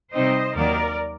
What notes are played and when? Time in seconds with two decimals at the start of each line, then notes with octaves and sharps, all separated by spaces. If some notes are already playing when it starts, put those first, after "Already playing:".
0.13 C3 G3 C4 D#4 C5 D#5
0.56 D#2 D#3 F#3 A#3 A#4 D5